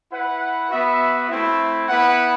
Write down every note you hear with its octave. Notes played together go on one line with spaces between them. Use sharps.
E4 B4 F#5
B3 F#4 B4 E5
A3 C4 E4
B3 E4 B4 F#5